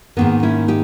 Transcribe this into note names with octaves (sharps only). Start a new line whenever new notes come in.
G#2 D#3 A#3 B3
C#4 E4
D#4 G4